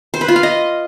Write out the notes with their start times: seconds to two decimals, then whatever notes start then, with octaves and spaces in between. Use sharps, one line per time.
0.14 C5
0.21 B4
0.28 F4
0.36 F5
0.43 D#5